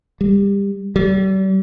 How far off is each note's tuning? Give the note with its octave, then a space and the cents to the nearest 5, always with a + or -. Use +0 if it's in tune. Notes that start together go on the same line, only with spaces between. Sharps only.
G3 +25
G3 -40